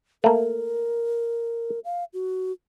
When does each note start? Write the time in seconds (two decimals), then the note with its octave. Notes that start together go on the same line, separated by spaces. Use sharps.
0.24 A3 A#3 A#4
1.84 F5
2.13 F#4